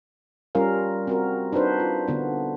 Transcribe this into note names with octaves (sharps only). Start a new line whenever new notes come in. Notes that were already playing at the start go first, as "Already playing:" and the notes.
G3 C#4 F4 A#4 F5
C4 F#4 A#4
D4 D#4 F#4 B4 C5
F4
D3 B3 D4